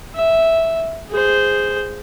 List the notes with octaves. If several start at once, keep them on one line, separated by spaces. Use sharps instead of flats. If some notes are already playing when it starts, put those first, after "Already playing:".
E5
G#4 C5